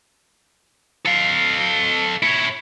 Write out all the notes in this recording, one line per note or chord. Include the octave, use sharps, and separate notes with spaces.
A4 F5
E4 C#5